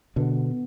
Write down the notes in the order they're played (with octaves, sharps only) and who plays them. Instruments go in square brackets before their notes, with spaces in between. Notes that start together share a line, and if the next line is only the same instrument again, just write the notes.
[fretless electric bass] B2 D3 [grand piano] B3